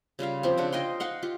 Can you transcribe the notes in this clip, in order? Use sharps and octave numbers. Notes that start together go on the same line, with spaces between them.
C#3 G3 F4 F5
F3 C4 G4
C#3 D4 F#5
F4 D#5 G5 C6
D#4 F5 F#5 C6
F4 G4